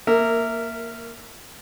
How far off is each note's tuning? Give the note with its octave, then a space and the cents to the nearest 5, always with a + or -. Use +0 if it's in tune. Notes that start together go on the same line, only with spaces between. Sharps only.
A#3 +0 A#4 -15 E5 +0